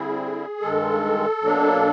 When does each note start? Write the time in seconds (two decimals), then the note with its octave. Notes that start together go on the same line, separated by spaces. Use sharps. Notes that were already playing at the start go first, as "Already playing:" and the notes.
Already playing: D3 G3 C4 E4 G#4
0.61 G2 D#3 G#3 A4
1.42 B2 F#3 A#3 D4